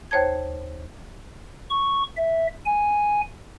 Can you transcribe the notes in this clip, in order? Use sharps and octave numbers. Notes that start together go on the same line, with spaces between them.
D#2 C5 C#5 A5 G#6
C#6
E5
G#5